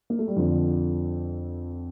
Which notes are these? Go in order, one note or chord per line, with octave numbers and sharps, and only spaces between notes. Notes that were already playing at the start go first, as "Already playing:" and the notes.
A#3
A3
G3
F2 D3 F3